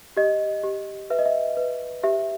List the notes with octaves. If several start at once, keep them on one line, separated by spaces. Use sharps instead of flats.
G4 D#5
G4
B4 E5
D#5
E5
B4
G4 E5